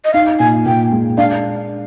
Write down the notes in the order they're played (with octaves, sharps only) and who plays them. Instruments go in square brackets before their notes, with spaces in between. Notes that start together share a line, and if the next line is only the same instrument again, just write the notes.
[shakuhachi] D#5
[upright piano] D#4 [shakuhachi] F5
[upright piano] A#2 [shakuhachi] G#5
[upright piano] A#2 [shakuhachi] G5
[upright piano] G#3
[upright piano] D4 [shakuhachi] F5